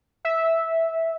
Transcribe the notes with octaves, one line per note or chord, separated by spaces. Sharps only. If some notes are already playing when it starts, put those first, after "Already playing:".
E5